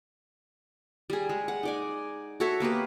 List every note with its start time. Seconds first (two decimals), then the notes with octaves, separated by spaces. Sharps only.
1.10 G3 G#4
1.29 G#3
1.48 F#5
1.63 D#4 D5 G#5
2.40 F#4 A4 C#5 E5
2.60 A#3 B3 G4 B4